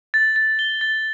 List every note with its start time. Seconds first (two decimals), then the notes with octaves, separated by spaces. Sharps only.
0.14 A6
0.36 A6
0.59 G7
0.81 A6